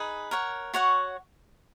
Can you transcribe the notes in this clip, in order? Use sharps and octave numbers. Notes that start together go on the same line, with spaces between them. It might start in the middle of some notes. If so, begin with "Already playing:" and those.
Already playing: D#4 G#4 B4
A#4 C#5 F#5
F#4 C#5 F#5 C#6